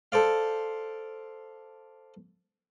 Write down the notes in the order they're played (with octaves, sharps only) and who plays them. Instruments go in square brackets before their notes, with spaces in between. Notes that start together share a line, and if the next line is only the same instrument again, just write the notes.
[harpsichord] A4 C5 D5 F5